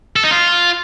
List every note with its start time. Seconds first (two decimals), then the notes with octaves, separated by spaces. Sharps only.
0.16 A4
0.24 D#4
0.31 F4